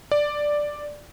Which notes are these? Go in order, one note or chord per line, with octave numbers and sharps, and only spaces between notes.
D5